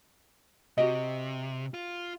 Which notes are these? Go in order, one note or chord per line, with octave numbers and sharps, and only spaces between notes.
C3 F#4 G4 D#5
F4